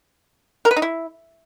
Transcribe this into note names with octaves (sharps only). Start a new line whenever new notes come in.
A#4
B4
D#4
E4